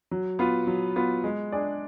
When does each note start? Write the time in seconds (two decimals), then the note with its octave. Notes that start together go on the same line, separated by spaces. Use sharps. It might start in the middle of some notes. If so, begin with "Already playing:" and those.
0.11 F#3
0.39 B3 F4
0.67 F#3
0.96 B3 F4
1.24 G#3
1.52 D4 G#4 D5